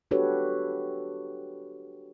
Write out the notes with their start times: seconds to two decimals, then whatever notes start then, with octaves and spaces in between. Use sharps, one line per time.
0.11 D4 F#4 G4 A4 B4 C#5